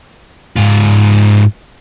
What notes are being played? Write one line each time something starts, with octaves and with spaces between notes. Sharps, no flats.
G#2 F4